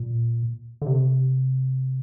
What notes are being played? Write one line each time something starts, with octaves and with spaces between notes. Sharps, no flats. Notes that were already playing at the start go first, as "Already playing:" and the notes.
Already playing: A#2
D3
C3